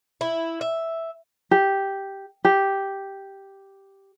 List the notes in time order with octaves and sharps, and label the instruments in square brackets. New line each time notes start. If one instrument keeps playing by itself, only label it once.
[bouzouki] E4
E5
[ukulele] G4
G4